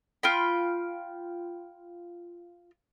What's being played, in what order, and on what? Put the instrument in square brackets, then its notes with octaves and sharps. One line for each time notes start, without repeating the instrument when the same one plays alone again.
[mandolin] F4 G5 B5